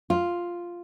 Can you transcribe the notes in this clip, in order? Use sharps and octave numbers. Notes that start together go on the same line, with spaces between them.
F4